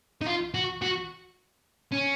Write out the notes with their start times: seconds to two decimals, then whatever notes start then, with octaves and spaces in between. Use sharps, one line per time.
0.22 D#4
0.27 F4
0.54 F#4
0.82 F#4
1.92 C#4